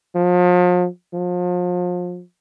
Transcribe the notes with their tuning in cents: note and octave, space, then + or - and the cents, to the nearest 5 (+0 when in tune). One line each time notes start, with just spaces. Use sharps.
F3 +40
F3 +35